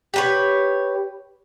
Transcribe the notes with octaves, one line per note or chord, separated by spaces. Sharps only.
G4 B4 C#5